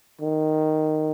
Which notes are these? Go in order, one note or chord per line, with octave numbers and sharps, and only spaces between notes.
D#3